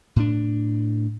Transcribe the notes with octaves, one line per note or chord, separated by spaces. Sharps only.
A2 D4